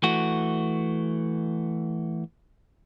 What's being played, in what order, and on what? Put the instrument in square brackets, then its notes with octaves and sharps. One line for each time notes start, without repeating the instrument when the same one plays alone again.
[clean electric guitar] E3 A3 F#4